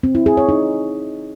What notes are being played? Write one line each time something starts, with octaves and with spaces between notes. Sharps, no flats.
C4
E4
G#4
C#5
D#4